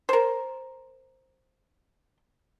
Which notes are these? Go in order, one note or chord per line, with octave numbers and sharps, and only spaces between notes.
A#4 C5